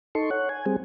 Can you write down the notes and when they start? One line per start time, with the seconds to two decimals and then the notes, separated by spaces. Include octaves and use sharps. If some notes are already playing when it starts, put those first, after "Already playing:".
0.15 D#4 A4 C6 C#6
0.31 C#5 F#5
0.49 G#5
0.66 G3 C4 G#4